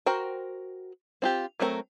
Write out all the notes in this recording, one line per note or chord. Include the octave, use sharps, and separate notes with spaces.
F#4 A#4 C5 G5
C4 F4 G4
F#3 A3 C4 F4 A#4